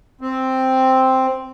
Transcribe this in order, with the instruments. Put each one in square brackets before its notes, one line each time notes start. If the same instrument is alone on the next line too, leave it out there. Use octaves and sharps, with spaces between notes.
[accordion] C4